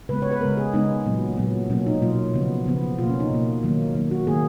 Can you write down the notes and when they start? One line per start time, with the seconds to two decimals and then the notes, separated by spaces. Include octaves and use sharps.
0.09 C#3 G#3 B3 B4
0.22 C#5
0.31 B4
0.41 C#3 G#3 B3 A#4
0.57 G#4
0.73 C#3 G#3 B3 D#4
1.06 A#2 F#3 B3
1.38 A#2 F#3 B3
1.70 B2 F#3 A#3 C#4
1.87 D#4
2.02 B2 F#3 A#3 F4
2.34 C#3 F3 B3
2.66 C#3 F3 B3
2.98 B2 A#3 F4
3.09 C#4
3.20 D#4
3.31 B2 A#3
3.63 D#3 F#3 A#3
3.95 D#3 F#3 A#3
4.11 F#4
4.27 D#3 A#3 G#4